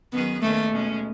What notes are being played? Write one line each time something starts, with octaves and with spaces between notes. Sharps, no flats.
D#3 F#3 B3 C#4 G#4 B4
D#2 D#3 G#3 A3 C#4
B2 G#3 C#4